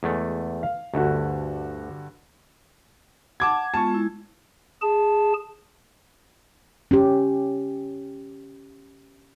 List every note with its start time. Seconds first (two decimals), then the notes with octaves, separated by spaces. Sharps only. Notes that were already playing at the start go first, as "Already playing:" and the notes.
0.03 E2 G#3 A3
0.63 F5
0.94 D2 G2 D3 F#4
3.40 F#5 A5 D6 G#6
3.74 G#3 B3 F4 A5 C#6
3.90 G#3 E4
4.81 G#4 A5
6.91 C#4 G4